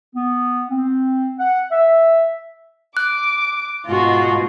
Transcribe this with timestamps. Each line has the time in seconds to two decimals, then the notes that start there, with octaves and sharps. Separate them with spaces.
0.15 B3
0.70 C4
1.39 F#5
1.71 E5
2.97 D6 F#6
3.87 G#2 B2 F4 F#4